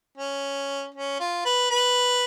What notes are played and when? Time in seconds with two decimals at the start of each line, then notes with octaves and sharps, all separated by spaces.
0.18 C#4
0.95 C#4
1.20 F4
1.45 B4
1.71 B4